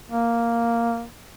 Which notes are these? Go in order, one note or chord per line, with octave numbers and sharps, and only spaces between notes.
A#3